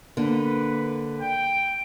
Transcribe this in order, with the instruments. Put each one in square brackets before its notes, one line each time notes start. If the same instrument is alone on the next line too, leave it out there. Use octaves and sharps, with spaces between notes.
[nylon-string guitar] D3 A#3 [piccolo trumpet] B4
[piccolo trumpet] G5